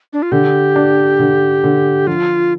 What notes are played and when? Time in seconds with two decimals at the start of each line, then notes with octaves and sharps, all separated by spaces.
0.13 D4
0.22 F4
0.32 D3 G4
0.76 D4
1.19 D3
1.64 D3
2.07 F3 F4